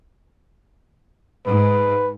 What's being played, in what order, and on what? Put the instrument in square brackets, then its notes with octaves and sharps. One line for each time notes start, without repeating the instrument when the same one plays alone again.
[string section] G#2 [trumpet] B4